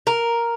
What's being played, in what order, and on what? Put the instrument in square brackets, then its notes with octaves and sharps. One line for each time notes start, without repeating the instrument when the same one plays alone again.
[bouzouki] A#4